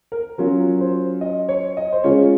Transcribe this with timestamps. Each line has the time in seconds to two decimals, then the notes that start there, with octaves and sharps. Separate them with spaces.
0.12 A#4
0.38 F#3 C#4 F4 A#4
0.81 C5
1.21 D#5
1.49 C#5
1.77 D#5
1.92 C5
2.04 C#3 G#3 C#4 F4 C#5